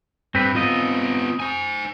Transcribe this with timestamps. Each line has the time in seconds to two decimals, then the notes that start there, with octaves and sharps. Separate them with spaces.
0.35 G2 C4 B4
0.55 B3 C4 F4 D#5
1.40 C5 G#5